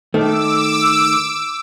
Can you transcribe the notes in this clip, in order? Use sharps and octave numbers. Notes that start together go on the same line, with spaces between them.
D#3 A3 D6 E6